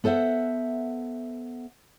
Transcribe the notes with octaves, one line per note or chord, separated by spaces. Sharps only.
B3 A4 C5 E5 F#5